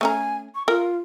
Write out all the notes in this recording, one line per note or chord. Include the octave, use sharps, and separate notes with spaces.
A3 C#4 G#5 A#5
C#6
F4 A#4